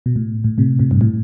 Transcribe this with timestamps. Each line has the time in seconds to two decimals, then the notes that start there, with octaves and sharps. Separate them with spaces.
0.06 B2
0.16 A2
0.44 A2
0.58 A2 C3
0.79 A2 C3
0.91 G2
1.01 A2